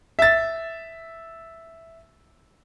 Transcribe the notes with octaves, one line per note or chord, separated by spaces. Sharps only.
E5 A6